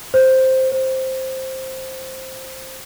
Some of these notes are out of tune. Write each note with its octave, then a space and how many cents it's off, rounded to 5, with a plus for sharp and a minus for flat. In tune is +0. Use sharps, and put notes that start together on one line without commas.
C5 +0
C5 +5